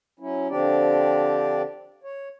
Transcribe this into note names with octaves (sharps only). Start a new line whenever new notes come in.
F#3 C#4 E4
D3 F3 C4 D4 G4 D5
C#5